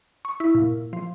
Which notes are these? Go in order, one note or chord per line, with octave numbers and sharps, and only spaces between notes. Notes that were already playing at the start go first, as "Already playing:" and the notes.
C#6
E4
A#2
F3